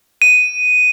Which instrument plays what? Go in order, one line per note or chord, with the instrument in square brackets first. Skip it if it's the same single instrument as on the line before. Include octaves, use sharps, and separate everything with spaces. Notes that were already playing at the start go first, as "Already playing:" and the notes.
[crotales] D#7